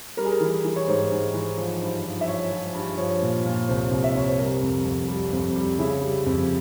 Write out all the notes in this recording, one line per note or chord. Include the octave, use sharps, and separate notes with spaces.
G3 A#4
G#4
A#4
E3
E3
C#5
G#2 C5
G#2
E3
F3
G2
F3
E5
F3 C#5
F3
G2
F3 C#5
A#2
A#2
C2 C5
C2
E5
C2 C#5
C5
G3 A#4
F2
F2
G3
F2
G3
C#3 E4
G3
F2